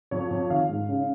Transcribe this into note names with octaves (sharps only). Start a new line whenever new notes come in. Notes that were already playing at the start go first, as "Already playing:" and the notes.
F2 C#5
F2
D#3 F5
G#2
C#3